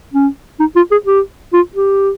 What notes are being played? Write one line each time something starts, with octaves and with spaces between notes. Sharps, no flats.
C#4
D#4
F4
G#4
G4
F4
G4